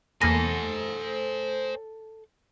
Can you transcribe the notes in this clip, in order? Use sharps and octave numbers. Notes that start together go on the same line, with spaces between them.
E2 A#3 A4 C5 G#5 B5 A#6